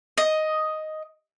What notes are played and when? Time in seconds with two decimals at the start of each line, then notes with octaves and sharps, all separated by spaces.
0.18 D#5